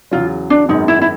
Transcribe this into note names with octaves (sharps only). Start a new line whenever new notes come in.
E2 C#3 F#3 F4
D4
G#1 F#2 D#3 G#3 B3 D#4
E4
E4